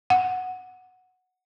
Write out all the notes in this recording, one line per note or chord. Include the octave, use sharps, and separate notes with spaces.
F#5